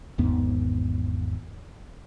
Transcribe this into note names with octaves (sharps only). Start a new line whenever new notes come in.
G#1 E2 G#2 B3